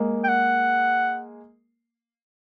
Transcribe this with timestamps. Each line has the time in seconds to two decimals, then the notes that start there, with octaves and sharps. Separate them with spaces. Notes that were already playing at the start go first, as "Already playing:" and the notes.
Already playing: G#3 A#3
0.24 G5
0.29 F#5